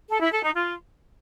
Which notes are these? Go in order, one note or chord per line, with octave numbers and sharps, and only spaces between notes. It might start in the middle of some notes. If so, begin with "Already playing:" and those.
A4
E4
A4
D#4
F4